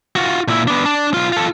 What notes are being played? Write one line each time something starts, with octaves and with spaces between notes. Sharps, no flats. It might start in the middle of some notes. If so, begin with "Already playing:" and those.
F4 F#4
A#2 E4
B3 D4
D4
B1 F4
F4 A4